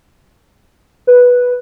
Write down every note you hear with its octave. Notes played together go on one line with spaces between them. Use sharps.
B4